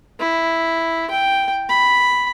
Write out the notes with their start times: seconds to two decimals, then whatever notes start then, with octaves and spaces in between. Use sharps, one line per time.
0.20 E4
1.11 G5
1.69 B5